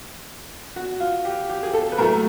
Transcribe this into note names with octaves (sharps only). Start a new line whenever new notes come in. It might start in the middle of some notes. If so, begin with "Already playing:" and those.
F#4
F4
G4
G4
G#4
A4
B4
A2 F#3 A3 A#4